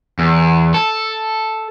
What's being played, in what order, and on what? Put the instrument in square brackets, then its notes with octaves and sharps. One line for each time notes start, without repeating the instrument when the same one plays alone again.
[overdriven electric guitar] E2
A4